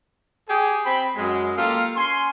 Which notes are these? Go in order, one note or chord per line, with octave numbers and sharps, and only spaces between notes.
G4 G#4
C4 B5
F#2 G#3
A#3 F4 G4 A4 F5
C#4 G#5 C6